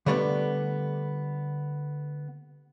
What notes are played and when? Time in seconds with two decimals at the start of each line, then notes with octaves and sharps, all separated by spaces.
0.06 D3 G3 A3 B3 D4